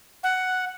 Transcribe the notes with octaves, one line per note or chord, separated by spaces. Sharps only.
F#5